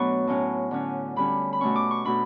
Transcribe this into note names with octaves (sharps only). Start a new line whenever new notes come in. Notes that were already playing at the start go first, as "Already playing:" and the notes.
Already playing: B2 F#3 A3 B3 D4 B5 C#6
A2 F#3 C#4
D3 F#3 C#4
D3 G3 C#4 B5
B5
B2 A3 C#4 C#6
D6
C#6
B2 A3 D4 B5